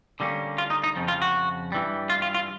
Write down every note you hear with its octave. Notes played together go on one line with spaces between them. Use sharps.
D3 G3 A#3 C#4
F4
D#4
D#4
F2 C#3 F3
F4
F#4
G2 E3 G3
F4
F4
F4